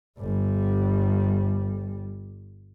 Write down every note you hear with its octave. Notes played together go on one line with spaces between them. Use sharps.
G1 G3